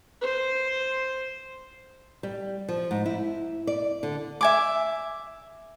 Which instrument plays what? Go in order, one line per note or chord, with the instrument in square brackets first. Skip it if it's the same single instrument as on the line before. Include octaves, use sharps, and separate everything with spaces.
[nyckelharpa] C5
[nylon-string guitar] G3
F3
G#2
E4
D5
D3
[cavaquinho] E5 G#5 D6